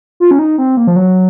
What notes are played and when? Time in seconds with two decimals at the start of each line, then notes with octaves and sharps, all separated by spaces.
0.20 F4
0.31 C#4
0.39 D#4
0.58 C4
0.77 A#3
0.87 F3
0.96 F#3